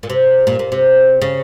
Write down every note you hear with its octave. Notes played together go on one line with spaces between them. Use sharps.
A#2
C3
A#2
A#2
C3
C#3